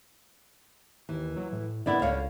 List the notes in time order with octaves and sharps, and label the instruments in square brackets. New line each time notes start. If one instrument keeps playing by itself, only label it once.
[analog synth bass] D#2 [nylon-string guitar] E3
[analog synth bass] F#3
A2
[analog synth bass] D3 [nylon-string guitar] B3 E4 D5
[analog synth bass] C#2 [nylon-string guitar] D3 C#5 F5